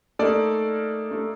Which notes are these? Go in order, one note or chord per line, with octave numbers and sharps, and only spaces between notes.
A3 A#3 D#4 A4 D5
A3